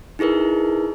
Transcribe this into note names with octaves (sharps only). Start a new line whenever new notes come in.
D#4 E4 G#4 A#4 B4